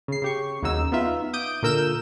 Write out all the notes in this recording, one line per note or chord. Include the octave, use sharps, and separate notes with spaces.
C#3 C7
C#3 G4 C#6
D#2 C#3 F#3 D#4 E6
B3 D#4 F4 E5
D6 D#6 G6 D7
A#2 D3 A#4 E6 G6 E7